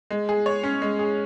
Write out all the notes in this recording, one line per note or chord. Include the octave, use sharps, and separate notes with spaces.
G#3
G#4
C#5
C#4
G#3
G#4